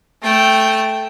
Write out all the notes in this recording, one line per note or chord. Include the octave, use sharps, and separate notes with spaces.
A3 G5